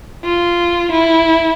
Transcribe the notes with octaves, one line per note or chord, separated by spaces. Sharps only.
F4
E4